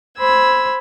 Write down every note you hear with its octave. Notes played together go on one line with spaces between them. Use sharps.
C5 B5 E6 G#6